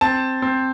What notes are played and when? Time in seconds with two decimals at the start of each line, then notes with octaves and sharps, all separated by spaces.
0.01 C4 A5
0.42 C4